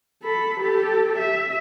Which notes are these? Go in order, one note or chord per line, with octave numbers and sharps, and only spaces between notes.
A4 B5
G4 A4
E5